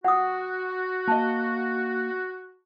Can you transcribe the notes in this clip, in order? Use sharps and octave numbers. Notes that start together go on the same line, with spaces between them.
F#4 F#5 D#6
A#3 D#5 A5